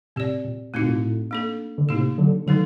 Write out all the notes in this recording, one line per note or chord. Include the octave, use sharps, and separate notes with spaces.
A2 C3 C4 G4 D5
A#2
A2 A3 C4 D#4 F#4
A#2
A2
A#3 D4 A4
D3
A2 C3 A#3 D#4 G4
D3 F#3
D3 D#3 F#3 A3 D#4 A4